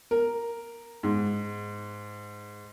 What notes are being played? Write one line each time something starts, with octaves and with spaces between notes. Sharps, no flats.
A#4
G#2